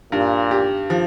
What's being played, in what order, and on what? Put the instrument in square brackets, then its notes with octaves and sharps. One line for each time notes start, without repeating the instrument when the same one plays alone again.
[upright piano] G2 [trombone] A#2
[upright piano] G4
F3